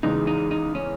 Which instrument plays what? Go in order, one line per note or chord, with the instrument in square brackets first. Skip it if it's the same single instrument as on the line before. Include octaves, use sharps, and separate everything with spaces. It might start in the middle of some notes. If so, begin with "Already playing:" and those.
[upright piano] E2 C#3 E3 G#3 [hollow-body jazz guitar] D#4
[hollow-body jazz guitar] D#4
D#4
C#4